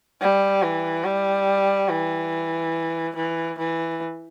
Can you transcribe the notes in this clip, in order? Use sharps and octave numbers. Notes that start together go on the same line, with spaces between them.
G3
E3
G3
E3
E3
E3